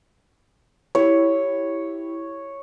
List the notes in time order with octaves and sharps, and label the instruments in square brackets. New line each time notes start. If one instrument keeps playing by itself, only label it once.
[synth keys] E4 G4 [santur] C#5